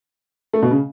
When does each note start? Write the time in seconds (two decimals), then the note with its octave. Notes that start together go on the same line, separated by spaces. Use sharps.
0.53 A3
0.62 B2
0.71 C#3